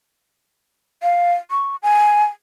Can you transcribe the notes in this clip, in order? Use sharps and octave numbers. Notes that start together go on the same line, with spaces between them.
F5
C#6
G#5